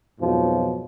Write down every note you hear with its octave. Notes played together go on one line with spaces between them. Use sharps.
F2 G#2 B2 F3 F#3